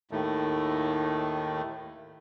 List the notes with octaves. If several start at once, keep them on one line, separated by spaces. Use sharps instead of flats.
D#2 A2 D#3 A3